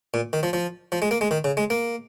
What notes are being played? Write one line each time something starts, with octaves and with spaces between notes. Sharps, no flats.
A#2
D#3
F3
F3
F3
G#3
A#3
G#3
D#3
C#3
G#3
A#3